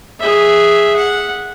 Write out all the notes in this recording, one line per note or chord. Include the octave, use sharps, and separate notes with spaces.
G#4 E5
F#5